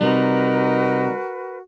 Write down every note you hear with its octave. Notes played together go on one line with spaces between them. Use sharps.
C3 G3 D#4 F#4 A#4 B4